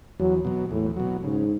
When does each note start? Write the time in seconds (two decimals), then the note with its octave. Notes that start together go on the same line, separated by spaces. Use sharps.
0.20 E2 F#3
0.45 B2 F#3
0.71 E2 A2
0.97 B2 F#3
1.23 G#2 C#3